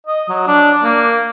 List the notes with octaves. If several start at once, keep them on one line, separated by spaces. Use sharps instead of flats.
D#5
F#3
D4
A#3